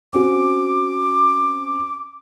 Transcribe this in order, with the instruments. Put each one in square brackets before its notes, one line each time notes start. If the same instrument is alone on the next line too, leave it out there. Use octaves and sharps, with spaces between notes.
[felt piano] C4 C#4 F#4 [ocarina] D6